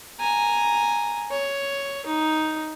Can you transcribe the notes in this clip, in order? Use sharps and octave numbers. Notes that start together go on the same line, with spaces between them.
G#5 A#5
C#5
D#4